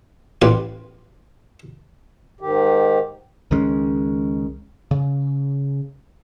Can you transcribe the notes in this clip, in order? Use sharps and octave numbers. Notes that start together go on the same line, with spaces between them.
A1 G4 B4 F5 C6
G#2 D#3 G4
C#2 D#3 G#3 C#4
C#3